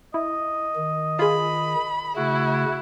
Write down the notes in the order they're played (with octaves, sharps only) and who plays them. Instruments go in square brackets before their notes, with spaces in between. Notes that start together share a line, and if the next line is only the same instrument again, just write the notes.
[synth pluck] E4 [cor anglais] D#5
[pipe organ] D#3
[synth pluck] F4 G#4 [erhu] B5
[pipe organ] C#3 A3 [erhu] E4 [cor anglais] F#4